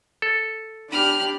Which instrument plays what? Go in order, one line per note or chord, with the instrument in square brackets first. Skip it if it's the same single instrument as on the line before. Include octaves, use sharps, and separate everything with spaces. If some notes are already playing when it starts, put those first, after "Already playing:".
[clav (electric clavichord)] A4
[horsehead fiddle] D4 G4 [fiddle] B5 F6